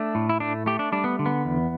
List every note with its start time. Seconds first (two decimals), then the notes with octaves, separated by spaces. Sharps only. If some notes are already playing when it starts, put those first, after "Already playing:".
Already playing: A3 D4
0.15 A2
0.29 E4
0.40 A3 D4
0.66 A3 G4
0.79 D4
0.92 G3 D4
1.04 B3
1.19 D3
1.26 B3
1.45 E2